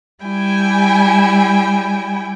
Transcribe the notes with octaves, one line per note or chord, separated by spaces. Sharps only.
G3 E4 G5 G#5